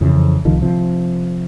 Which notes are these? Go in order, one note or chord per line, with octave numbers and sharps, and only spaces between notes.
F2 C#3 E3
C2 D#3 F3
C3 F3